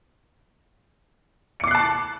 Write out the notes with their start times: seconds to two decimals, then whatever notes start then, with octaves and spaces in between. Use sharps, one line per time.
1.60 C#7
1.64 D6
1.67 C7
1.71 F#6
1.75 A5